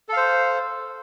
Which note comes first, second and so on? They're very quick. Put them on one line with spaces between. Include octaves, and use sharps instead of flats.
A4 F5 C5